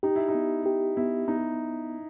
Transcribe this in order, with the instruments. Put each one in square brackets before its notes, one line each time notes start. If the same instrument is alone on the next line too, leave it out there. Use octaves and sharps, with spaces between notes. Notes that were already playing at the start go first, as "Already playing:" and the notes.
[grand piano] D#4 [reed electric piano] G4
[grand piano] E4
D#4
[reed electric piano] B3
G4
[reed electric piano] B3 [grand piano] E4
[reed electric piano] B3 [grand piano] D#4